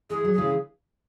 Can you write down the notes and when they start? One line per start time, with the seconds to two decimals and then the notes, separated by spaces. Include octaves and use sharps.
0.10 E3 G#4
0.24 F#3
0.34 C#3 E3 G#4